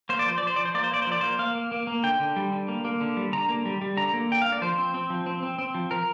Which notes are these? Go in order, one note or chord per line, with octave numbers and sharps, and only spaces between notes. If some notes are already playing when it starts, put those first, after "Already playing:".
A#3 C5
D5
F3 C5
D5
F3 C5
F3 D5
C5
A#3 D5
C5
A#3 D5
C5
F3 D5
A#3 C5
A#3 F5
A#3
A#3
A#3
D3 G5
D3
G3
D3
A#3
A#3
D3
G3
D3 A#5
A#3
G3
G3
D3 A#5
A#3
D3 G5
A#3 F5
D5
F3 C5
C4
C4
F3
C4
C4
C4
F3
F3 A#4